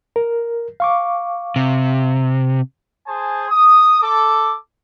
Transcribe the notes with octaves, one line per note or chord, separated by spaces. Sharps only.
A#4
F5 C#6 D6
C3
G#4 C5 G#5 A5
D#6
A4 D6